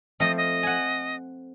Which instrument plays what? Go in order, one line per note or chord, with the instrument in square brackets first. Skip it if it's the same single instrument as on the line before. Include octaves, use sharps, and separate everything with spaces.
[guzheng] F3 A3 C4 [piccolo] D#5
[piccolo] D#5
[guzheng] F#5 G#5